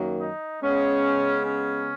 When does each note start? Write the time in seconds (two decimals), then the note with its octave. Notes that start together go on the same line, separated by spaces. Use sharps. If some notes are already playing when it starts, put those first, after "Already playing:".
Already playing: F#2 D#3 F#3 A#3
0.21 D#4
0.62 C#3 G#3 B3 C#4
1.46 C#4